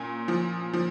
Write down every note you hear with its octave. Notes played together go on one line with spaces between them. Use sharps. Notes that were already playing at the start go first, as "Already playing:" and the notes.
Already playing: A#2 C#4
F3
F3